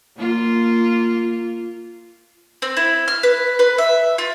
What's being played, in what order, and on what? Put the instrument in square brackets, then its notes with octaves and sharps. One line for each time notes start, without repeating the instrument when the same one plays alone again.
[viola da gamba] A#3 F4
[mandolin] C4
E4
F6
B4
B4
E5
F4